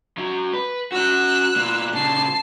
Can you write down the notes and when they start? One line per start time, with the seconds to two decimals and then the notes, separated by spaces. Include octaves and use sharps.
0.18 F#2 F#3
0.53 B4
0.92 C#4 F#4 E6 F#6
1.56 B2 A#3
1.93 A#2 C#3 A5 C7